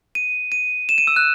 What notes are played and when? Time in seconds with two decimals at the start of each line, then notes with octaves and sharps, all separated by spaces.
0.15 D#7
0.52 D#7
0.89 E7
0.98 D#7
1.07 E6
1.16 F#6